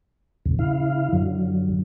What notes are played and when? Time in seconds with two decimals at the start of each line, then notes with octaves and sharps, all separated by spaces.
0.46 E2 A#2 C#3
0.59 C#3 E4 F5
1.13 F#2 D3 F#3